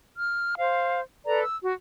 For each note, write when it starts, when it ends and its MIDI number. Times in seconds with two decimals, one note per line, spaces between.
0.16 0.55 89
0.58 1.00 72
0.58 1.00 77
1.26 1.42 69
1.26 1.42 71
1.26 1.42 74
1.26 1.42 82
1.43 1.56 88
1.62 1.73 66